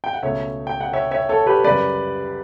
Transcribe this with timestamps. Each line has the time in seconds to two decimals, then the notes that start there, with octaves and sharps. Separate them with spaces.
0.04 G5
0.13 F#5
0.23 C#2 B2 A3 C#5 E5
0.67 G5
0.81 F#5
0.93 C#5 E5
1.11 C#5 E5
1.29 A4 C#5
1.46 G4 B4
1.64 F#2 C#3 G3 B4 D5